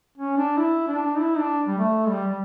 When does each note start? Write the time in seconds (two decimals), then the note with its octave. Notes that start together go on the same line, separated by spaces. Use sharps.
0.18 C#4
0.37 D4
0.57 E4
0.87 D4
1.18 E4
1.38 D4
1.67 G3
1.78 A3
2.08 G3
2.27 G3